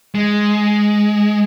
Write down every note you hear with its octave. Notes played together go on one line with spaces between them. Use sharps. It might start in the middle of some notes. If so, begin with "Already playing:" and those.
G#3